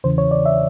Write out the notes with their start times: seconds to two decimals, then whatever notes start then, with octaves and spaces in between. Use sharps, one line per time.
0.04 E2 C#3 E3 C5
0.18 C#5
0.31 D5
0.46 E5